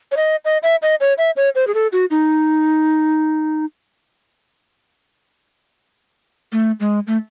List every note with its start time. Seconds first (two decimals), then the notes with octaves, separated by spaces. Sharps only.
0.12 C#5
0.17 D#5
0.45 D#5
0.63 E5
0.82 D#5
1.00 C#5
1.18 E5
1.36 C#5
1.55 C5
1.67 G#4
1.74 A4
1.92 F#4
2.11 D#4
6.52 A3
6.80 G#3
7.07 A3